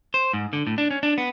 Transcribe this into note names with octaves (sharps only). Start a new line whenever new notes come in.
C5
G#2
D3
A2
D4
C#4
D4
B3